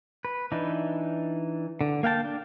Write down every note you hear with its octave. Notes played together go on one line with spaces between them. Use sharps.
B4
E3 D4 D#4
D3
A#3 F5 G5 A5
D4